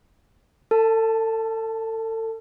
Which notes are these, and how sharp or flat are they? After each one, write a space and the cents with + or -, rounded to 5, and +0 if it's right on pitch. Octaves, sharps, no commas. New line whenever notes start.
A4 +35 A5 +0